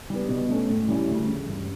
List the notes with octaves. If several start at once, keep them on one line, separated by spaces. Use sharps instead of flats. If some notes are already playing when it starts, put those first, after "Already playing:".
G3 B3
B2
A3 C#4
A2
G3 C#4 E4
D2
C#3 E3
G2